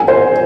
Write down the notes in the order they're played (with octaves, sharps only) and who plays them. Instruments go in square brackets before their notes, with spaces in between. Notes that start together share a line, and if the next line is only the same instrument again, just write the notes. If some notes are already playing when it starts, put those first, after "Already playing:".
Already playing: [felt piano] G#5
C5